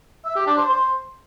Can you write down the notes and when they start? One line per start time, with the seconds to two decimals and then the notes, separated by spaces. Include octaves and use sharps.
0.25 E5
0.36 G4
0.47 D4
0.58 C5
0.69 C5